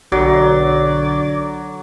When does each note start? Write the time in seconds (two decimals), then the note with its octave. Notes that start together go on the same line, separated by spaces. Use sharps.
0.12 B1 D3 F#3 D5